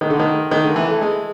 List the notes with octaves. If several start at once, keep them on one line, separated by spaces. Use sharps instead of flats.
D#3
D3
D#3
D#3
D3
E3
A3
G#3